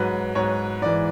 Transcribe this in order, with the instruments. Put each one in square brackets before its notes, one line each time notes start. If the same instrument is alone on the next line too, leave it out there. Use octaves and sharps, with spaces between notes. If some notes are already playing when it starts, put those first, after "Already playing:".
Already playing: [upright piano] G#2 F#3 B4
G#2 F#3 C#5
G#2 E3 D5